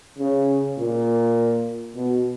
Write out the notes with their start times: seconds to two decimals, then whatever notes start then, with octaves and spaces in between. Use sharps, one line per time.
0.19 C#3
0.78 A#2
1.96 B2